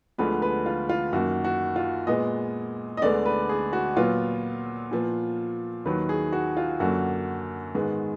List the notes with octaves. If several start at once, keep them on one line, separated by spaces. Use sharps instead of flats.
D2 D3 F3 G#3 B3 B4
B4
F4
F4
F#2 D#3 A#3 F#4
F#4
F4
A#2 G#3 B3 D#5
D#5
D2 D3 G#3 B3 D5
B4
G#4
F#4
A#2 F#3 B3 F4
A#2 F3 B3
D#2 D#3 F#3 B4
G#4
F#4
F4
F#2 D3 F#3 A#3 F#4
G#2 D#3 G#3 B3